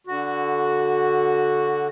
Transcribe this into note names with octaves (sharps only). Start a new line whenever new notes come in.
D3 F#4